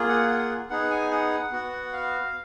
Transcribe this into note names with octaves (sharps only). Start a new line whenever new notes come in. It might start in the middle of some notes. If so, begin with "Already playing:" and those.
Already playing: A#3 F4 G#4
F#5
F#5
B3 D#4 G#4 F#5
G#5
F#5
B3 F#4
F5